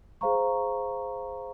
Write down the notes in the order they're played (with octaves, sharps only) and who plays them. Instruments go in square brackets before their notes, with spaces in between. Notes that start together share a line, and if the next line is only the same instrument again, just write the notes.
[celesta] G#4 C5 F5 A#5 C#6